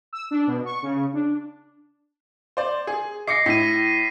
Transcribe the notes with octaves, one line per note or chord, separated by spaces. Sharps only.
E6
D4
B2
C#6
C#3
D4
C5 D5
G#4
D#5 D6 A#6 C7 C#7
A2 B6 D#7